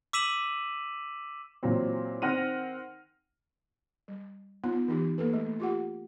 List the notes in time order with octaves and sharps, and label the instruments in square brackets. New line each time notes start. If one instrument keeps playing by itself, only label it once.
[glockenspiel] D6 E6 B6 D#7 E7 F#7
[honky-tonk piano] A#2 E3 F#3 C4
D#3 C4 F#5 F6 A#6 D#7
[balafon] G3
B3 D#4 F4
E3 D#4 G4
A#3 A4 B4
A3
F4 G4 F#5